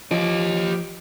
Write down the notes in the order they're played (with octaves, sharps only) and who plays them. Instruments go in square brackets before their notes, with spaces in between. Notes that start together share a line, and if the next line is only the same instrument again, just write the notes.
[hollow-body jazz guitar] F3 [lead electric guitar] G4 D#5